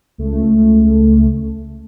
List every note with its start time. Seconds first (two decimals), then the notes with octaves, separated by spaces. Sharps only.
0.18 C#2 A3